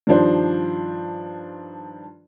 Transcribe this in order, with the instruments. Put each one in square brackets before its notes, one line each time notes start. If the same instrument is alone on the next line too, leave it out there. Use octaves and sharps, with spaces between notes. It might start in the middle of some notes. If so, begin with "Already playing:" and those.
[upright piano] G2 D#3 F3 D4 C5 A5